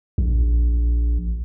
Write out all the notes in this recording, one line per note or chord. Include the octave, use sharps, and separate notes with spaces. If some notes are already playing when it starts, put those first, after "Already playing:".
A#1